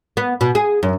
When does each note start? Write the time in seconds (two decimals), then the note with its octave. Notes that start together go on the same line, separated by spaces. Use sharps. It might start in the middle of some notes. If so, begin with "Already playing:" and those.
0.17 B3
0.41 B2
0.55 G#4
0.83 F#2